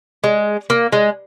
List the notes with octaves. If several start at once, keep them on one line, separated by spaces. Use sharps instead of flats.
G#3
A#3
G#3